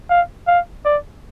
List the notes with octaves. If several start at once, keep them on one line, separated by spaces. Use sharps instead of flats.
F5
F5
D5